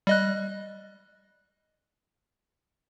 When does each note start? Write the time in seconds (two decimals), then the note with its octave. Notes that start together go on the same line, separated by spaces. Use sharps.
0.07 G3 D#5 F#6